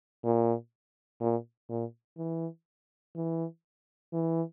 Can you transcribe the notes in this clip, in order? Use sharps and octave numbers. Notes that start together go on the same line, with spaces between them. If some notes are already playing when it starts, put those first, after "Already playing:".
A#2
A#2
A#2
E3
E3
E3